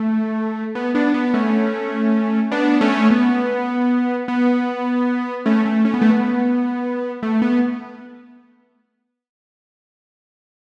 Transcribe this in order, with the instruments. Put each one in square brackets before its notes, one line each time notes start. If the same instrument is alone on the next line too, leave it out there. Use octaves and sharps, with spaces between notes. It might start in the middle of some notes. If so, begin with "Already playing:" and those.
Already playing: [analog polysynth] A3
B3
B3 D4
B3
A3 C#4
B3 D4
A3 C#4
B3
B3
A3 C#4
A3
C#4
B3
A3
B3
A3
B3